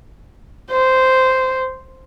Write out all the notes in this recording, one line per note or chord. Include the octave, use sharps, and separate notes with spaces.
C5